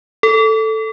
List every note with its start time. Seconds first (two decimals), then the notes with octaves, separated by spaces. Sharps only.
0.23 A4